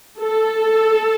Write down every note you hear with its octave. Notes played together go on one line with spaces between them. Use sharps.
A4